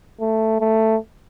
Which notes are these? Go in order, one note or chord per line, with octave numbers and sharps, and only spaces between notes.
A3
A3